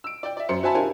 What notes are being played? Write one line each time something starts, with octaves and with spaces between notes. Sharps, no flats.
E6 D7
D5 G5
D5 E5
F#2 C5 C6 C#7
F#4 C5 E5 G#5 A5 B5
D4 F4 G4 A#4 C5 G#5